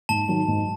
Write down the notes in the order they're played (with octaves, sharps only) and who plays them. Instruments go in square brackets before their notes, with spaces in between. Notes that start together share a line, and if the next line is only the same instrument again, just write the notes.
[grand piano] G#2 [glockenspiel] A5
[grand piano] D#3 F#3
G#2